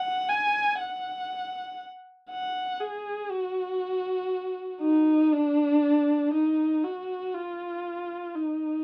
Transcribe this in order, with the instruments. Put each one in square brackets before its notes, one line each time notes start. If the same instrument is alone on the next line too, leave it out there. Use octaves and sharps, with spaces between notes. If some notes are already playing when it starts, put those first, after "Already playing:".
Already playing: [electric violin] F#5
G#5
F#5
F#5
G#4
F#4
D#4
D4
D#4
F#4
F4
D#4